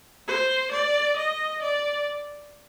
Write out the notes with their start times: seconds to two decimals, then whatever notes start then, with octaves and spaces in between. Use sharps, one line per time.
0.27 C5
0.72 D5
1.17 D#5
1.62 D5